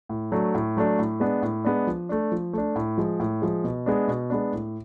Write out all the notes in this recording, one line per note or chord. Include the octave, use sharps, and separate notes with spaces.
A2
F#3 A3 D4
A2
F#3 A3 D4
A2
G#3 B3 D4
A2
G#3 B3 D4
F3
A3 D4
F3
A3 D4
A2
F3 G#3
A2
F3 G#3
B2
G#3 B3 D4
B2
G#3 B3 D4
A2